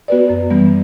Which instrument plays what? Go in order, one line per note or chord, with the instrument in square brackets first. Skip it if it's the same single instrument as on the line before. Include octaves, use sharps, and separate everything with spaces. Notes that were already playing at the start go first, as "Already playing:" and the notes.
[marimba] B3 F#4 B4 D5
F#2
E3 G3 B3